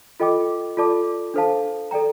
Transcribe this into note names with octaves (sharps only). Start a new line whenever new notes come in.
F4 A4 D#5 G5 D6
F4 A4 D5 A5 D6
D4 A4 C5 F5 A5
A4 D5 G5 A#5